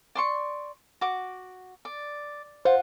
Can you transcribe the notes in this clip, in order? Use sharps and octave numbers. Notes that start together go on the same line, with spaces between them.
D5 C6 C#6
F#4 D6
D5
F4 C5 F#5